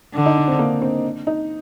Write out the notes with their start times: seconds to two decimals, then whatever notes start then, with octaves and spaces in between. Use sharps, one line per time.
0.14 D3
0.26 D#4
0.37 D4
0.48 C4
0.59 A#3
0.82 C4
1.27 D#4